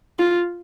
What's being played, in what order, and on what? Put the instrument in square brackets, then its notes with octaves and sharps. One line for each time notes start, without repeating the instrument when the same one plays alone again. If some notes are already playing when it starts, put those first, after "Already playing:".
[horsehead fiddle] F4